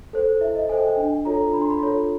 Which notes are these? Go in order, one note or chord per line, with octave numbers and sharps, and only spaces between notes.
A4 C5
E4 E5
D#5
A4 C5 G#5
G5
G#5
D4
F4 A4 C#5 A#5
D4 B5
C6
B5
F4 A4 C#5